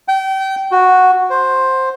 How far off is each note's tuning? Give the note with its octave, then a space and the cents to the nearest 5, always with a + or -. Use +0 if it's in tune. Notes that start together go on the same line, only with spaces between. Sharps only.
G5 -30
F#4 -5
C5 +5